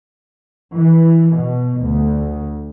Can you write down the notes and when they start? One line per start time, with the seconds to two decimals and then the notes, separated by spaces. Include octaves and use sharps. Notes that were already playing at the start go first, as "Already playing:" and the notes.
0.75 E3
1.34 B2
1.81 D2